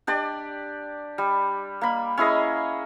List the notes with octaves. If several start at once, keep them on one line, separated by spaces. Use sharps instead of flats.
D4 G4 D5
G3
A#3 B5
C#4 E4 G#4 D#5